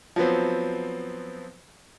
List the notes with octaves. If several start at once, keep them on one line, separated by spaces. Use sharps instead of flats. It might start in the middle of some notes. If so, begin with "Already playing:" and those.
F3 F#3 B3 C4